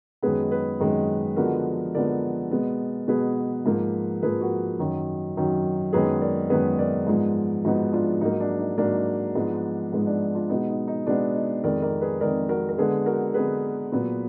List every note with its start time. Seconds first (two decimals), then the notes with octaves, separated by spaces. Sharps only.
0.23 F#2 D#3 G#3 B3 G#4 B4
0.51 G#4 B4
0.80 F#2 D#3 G#3 B3
1.36 D3 F3 G#3 B3 F#4 A#4
1.94 D3 F3 G#3 B3 A#4 D5
2.51 B2 G#3 B3
3.08 B2 G#3 B3 G#4 B4
3.66 G#2 F3 A#3
4.22 G#2 F3 A#3 G#4 B4
4.41 F#4 A#4
4.79 F#2 D#3 F#3
5.37 F#2 D#3 F#3
5.93 F#2 D#3 G#3 B3 G#4 B4
6.22 A#4 D5
6.50 F#2 D#3 G#3 B3 G#4 B4
6.79 A#4 D5
7.07 G#2 F3 G#3 B3
7.64 G#2 F3 G#3 B3 D#4 F#4
7.93 D4 F4
8.21 G#2 F#3 A#3 D#4
8.40 D4
8.59 D#4
8.78 G#2 F#3 A#3 D4
9.35 G#2 F3 G#3 B3
9.92 G#2 F3 G#3 B3 D#4
10.07 D4
10.35 D4 F4
10.50 B2 G#3 B3 D#4
10.68 D#4
10.88 D#4
11.07 B2 G#3 B3 D4
11.35 D#4
11.64 F2 D#3 G#3 A#4 D5
11.82 A#4 D5
12.01 G#4 B4
12.20 F2 D#3 G#3 A#4 D5
12.49 F#4 A#4
12.69 A#4
12.78 D3 G#3 B3 G#4 B4
13.06 F#4 A#4
13.34 D3 G#3 B3 G#4 B4
13.92 A#2 F#3 B3